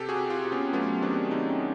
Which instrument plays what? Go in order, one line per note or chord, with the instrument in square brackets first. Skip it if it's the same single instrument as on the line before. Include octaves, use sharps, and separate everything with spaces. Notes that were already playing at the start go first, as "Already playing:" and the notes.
Already playing: [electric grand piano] C3 G4 A4
F#4 G#4
C3
F4 G4
C3
B3 C#4
F#3 A3 B3
D#3 C4 D4
C3 C#4 D#4